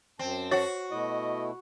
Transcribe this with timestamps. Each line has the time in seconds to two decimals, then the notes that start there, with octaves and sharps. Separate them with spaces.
0.19 F#2 C4 A5
0.51 F#4 C#5
0.91 B2 A3 E4 D#5